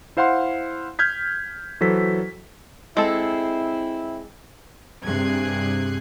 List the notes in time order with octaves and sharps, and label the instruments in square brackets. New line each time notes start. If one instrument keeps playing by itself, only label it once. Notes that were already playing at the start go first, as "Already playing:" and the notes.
[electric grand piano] E4 C5 F5 F#5 C6
F6 G6 G#6 B6
E3 F#3 A4 C5 B6
[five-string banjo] G#3 A4 [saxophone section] C4 E4
[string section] G2 C3 G#4 F#6 G#6 C7